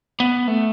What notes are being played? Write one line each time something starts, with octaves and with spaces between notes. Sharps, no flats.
B3
A3